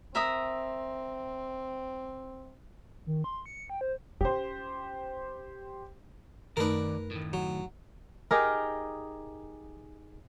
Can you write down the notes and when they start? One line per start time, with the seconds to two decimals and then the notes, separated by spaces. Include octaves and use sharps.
0.15 C4 A#4 E5 D#6
3.06 D#3
3.24 C6
3.46 C#7
3.70 G5
3.81 C5
4.21 C#4 F4 G4 C5
6.57 F#2 D#3 A3 D#4 A#4 B4 D5
7.11 A2 D#3
7.33 F#3
8.31 D#4 G4 G#4 A#4